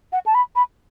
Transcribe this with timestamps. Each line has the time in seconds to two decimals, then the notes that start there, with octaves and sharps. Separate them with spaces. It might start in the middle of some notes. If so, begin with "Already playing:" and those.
0.12 F#5
0.26 A5
0.34 B5
0.55 B5